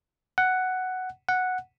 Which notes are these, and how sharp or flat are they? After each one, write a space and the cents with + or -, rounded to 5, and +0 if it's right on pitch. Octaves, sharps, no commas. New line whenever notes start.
F#5 +5
F#5 -5